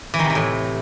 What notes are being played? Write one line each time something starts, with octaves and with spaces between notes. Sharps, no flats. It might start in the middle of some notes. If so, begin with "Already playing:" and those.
E3
D#3
C3
E3
A2